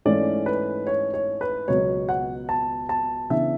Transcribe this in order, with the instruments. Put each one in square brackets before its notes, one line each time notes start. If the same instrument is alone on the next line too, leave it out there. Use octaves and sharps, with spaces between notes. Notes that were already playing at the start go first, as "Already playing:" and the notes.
[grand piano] G#2 E3 A3 C#4 D5
B4
C#5
C#5
B4
C#2 B2 F#3 B3 C#5
F#5
A5
A5
C#3 E3 B3 D4 E5